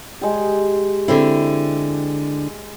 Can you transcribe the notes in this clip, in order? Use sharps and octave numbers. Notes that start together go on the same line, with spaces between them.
G#3 G4
D3 C4 E4